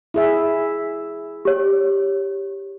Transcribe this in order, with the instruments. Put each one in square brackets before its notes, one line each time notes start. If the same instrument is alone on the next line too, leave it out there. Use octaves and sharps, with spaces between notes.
[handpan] E4 G#4 E5
[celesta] G4 C#5